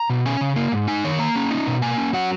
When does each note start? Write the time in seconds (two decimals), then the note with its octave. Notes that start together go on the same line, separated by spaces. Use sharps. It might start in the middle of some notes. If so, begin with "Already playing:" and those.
Already playing: A#5
0.10 B2
0.26 C#4 G#5
0.41 C#3
0.56 A#3
0.72 G#2
0.88 D#4 G#5
1.04 D#3 C#5
1.19 A#3 A#5
1.36 C#4
1.51 D#4
1.67 B2
1.82 A#3 G#5
1.98 C#4
2.13 F#3 F#5